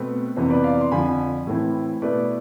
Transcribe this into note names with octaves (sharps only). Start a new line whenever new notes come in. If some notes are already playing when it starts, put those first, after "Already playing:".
Already playing: B2 A3 C4 B4
F2 C3 E3 B3 C5
B4 D5
D5 F5
C6
F2 D3 F3 G#5 B5
A2 E3 A3 C4 E4
B2 A3 E4 B4 D5